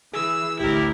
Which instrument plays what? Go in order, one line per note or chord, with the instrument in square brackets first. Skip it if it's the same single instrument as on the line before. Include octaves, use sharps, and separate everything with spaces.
[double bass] E3 [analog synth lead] G#4 [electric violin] E6
[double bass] A1 D2 [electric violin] E4 A#4 [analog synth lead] G4